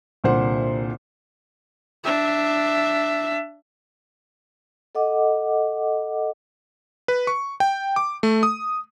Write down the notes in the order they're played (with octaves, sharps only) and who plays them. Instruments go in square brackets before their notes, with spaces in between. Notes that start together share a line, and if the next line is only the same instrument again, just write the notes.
[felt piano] C2 A#2 D3 C5 F#5
[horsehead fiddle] D4 E5
[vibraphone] A4 D#5 F#5 D6
[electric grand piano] B4
C#6
G5
D6
A3
D#6